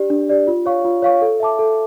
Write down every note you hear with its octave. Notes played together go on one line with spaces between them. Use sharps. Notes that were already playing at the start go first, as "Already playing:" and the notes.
Already playing: D4 G4 D5
D4
G4 D5
F4
C#5 F5 C#6
F4
C#5 F5 C#6
A4
E5 A5 D6
A4